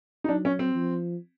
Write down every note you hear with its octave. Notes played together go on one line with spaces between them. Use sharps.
D#4
F#3 D4
C#4
C4
F3